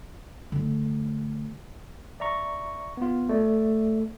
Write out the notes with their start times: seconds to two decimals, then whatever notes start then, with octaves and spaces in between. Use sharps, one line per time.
0.52 D3 A3
2.20 D5 E5 A#5 C#6
2.97 B3 F4
3.29 A3 D5